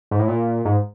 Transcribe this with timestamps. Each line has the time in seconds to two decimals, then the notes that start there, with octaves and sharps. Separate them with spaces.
0.11 G#2
0.20 A2
0.28 A#2
0.65 G#2